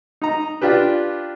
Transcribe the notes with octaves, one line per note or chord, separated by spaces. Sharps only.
D#4 A#5
D4 F4 G4 B4